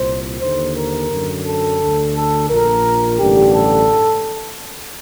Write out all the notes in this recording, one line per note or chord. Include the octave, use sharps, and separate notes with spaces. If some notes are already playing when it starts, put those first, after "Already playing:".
Already playing: C2 A#2 C5
D#2 D3 C5
A#4
F#2 D3
A4
D2 D3
A4
A#1 A#2 A#4
A1 G2 D3 G4
A4